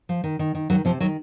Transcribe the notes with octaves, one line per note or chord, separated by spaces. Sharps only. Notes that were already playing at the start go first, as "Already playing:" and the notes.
F3
D#3
D#3
D#3
D#3 F#3
C3 F3
D#3 F#3